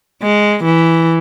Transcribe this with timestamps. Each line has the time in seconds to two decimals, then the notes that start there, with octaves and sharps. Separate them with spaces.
0.23 G#3
0.64 E3